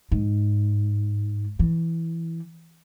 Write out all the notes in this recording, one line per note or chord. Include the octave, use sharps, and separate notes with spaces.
G#2
E3